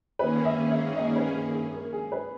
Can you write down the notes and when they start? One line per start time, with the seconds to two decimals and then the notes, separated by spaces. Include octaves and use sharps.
0.19 D#3 A#3 C#4 G#4 B4
0.45 E5
0.70 E5
0.96 D#5
1.16 B4
1.34 G#4
1.54 G#4
1.73 A#4
1.93 G#4
2.12 B4